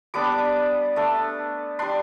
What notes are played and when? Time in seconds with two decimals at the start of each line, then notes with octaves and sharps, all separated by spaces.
0.14 G3 B3 D4 D6
0.96 A3 D4
1.79 G3 D4 C6